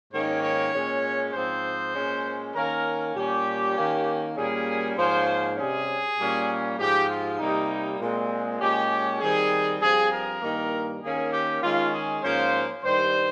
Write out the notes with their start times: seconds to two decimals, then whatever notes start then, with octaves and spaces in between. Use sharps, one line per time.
0.12 G#2 D#3 A#3 C#4 C#5
0.42 C#5
0.72 A#2 G#3 C#4
1.33 G#2 F3 C4 C5
1.93 A#2 G#3 C#4
2.54 D#3 A#3 C#4 A#4
3.14 A#2 G3 C#4 G4
3.75 D#3 A#3 C#4
4.35 A#2 G3 A#3 C#4 G#4
4.96 G#2 F3 A#3 C#4 C5
5.56 C3 G3 C#4 G#4
6.17 A#2 G3 A#3 C#4
6.78 G#2 F3 G#3 G4
7.09 F4
7.38 C3 G3 A#3 D#4
8.00 A#2 G#3 C4
8.60 A#2 G#3 C#4 G4
9.20 D#3 G3 C4 G#4
9.81 G2 F3 C4 G#4
10.11 A#4
10.41 G2 D#3 A#3
11.01 D#3 A#3 C#4 G#4
11.32 G4
11.62 D#3 G#3 C#4 F4
11.93 G#4
12.22 G#2 F3 A#3 C#4 C5
12.83 G2 D#3 G3 C5